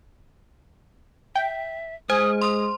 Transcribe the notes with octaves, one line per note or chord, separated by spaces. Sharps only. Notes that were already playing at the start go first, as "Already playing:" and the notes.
E5 G5
G#3 C5 G#5 D#6
C6 D#6